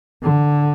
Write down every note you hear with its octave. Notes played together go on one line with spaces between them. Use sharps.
D3